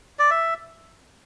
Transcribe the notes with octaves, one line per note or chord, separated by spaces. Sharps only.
D5
E5